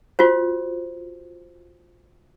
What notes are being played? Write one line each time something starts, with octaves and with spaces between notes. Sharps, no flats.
F4 F#4 C5